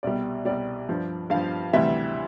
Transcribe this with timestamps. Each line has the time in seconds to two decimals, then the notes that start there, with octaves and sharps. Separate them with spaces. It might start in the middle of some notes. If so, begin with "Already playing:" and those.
0.03 C2 B2 G3 D5
0.45 C2 B2 G3 D5
0.89 G2 F3
1.30 G2 F3 F5
1.73 D2 C3 E3 G3 E5